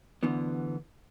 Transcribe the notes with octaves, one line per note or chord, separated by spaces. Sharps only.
D2 D3 E3 B3